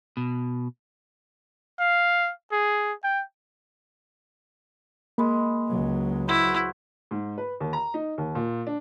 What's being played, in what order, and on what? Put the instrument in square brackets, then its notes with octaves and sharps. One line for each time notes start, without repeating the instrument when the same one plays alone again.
[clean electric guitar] B2
[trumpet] F5
G#4
G5
[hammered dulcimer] G#3 B5 [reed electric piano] A#3
[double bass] C#2 F#3
[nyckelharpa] E4 [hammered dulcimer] F#4 B4 C5
[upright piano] G#2
B4
D#2
A#5
D#4
D#2
A#2
D4